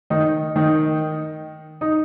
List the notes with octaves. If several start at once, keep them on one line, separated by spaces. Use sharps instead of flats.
D#3 D#4
D#3 D#4
D#4